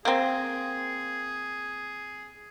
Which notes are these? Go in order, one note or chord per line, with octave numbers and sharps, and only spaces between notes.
A#3 C4 G#4